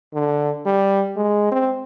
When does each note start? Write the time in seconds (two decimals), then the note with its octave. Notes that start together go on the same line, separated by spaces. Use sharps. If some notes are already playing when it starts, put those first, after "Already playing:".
0.14 D3
0.66 G3
1.16 G#3
1.51 C4